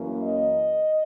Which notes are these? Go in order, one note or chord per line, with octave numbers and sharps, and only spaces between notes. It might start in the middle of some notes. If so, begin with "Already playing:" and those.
Already playing: F#2 E3 A#3 C#4
D#5